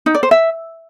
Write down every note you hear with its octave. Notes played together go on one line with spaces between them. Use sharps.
D#4
D5
C5
E5